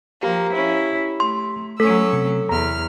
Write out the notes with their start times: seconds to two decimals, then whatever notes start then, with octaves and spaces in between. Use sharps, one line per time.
0.23 F3 A#3 G4 A#5
0.53 C#4 E4
1.20 A3 C6
1.80 F#3 A3 C#4 A4 E6
2.13 C3
2.49 E2 A#5 F6